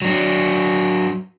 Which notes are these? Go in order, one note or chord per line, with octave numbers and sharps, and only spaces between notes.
F#3 D4